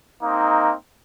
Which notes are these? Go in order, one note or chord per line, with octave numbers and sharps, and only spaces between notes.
A#3 C4 D#4